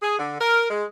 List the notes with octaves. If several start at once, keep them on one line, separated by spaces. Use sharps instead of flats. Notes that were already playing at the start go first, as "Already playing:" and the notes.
G#4
D3
A#4
G#3